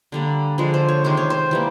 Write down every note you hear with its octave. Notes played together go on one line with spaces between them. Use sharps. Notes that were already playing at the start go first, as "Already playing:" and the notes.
D3 G3 A#3
D3 F3 G#3
C5
C#5
C3 D#3 G#3 C5
C#5
C5
E3 G3 A#3